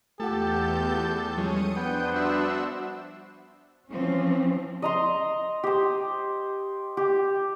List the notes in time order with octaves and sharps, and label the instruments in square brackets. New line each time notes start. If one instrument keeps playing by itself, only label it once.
[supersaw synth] E2 G6 [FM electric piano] A3 F4 F#5 [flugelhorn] G4 [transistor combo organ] A4
[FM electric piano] F3 G3 [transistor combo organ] G#3 C#4 [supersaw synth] D#6 C#7 D#7
[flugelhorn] B3 [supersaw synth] D4 C5 [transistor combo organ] G5
[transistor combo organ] F#4 E5
[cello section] E3 F3 C4 C#4
[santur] D#5 A#5 C6
G4 C5
G4